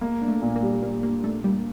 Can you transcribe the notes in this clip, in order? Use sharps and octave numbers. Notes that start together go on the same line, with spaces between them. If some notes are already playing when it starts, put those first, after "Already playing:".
G#3 A#3
D4
A3
A#2
A#3
G3
G3 A#3
A#3 D4
A3 D4
G3 A#3